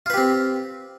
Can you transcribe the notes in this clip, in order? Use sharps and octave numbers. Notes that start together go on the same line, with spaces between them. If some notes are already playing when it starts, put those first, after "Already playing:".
C4 F4 G4 B4